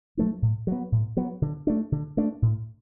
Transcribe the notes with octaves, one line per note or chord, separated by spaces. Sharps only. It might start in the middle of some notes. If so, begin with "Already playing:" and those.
F#3 A3 D4
A2
F#3
B3
A2
F#3 B3
D3
A3 D4
D3
A3 D4
A2